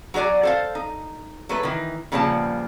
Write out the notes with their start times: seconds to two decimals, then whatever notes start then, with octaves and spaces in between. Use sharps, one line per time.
0.14 F#3 F#4 G#4 D5 G#5
0.43 A4 C5 F5
0.75 D#4
1.49 F#3 A3 B4
1.63 D#3 E3
2.12 A#2 C#3 F3 G3 B3 A5